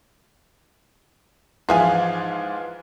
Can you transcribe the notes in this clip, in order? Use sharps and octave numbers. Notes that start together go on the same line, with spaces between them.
G#2 E3 F3 G#4 E5 F5 G#5